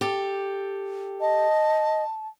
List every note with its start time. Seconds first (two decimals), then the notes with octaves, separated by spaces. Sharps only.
0.01 G4 A4
1.21 D#5 A5